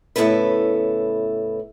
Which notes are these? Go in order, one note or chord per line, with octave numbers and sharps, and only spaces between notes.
A2 C#3 B3 E4 A4 B4